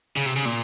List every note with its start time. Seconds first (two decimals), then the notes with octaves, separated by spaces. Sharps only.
0.16 C#3
0.26 C3
0.36 C#3
0.45 A#2